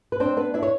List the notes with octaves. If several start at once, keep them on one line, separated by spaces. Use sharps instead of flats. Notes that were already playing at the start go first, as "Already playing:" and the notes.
B4
C4 D4 C5
B3 D4 B4
D4 E4 E5
C#5